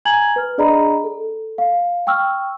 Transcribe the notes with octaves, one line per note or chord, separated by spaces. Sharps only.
G#5 A#5 G#6 F#7
B4 F6
D4 G#4 D5 D#5 A#5 B5
A4
F5
G5 C#6 E6 F6